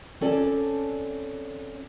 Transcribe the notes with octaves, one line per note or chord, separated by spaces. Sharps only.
C4 C#4 A4 D5 A5